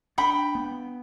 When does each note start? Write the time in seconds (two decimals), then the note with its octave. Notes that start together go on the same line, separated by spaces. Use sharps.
0.18 D4 G5 B5
0.55 B3